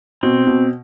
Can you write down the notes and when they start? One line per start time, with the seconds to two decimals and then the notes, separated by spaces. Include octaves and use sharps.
0.23 B2 C4
0.47 B2